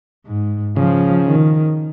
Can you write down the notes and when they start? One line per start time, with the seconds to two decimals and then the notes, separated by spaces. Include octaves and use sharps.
0.26 G#2
0.76 C#3 F3
1.25 D#3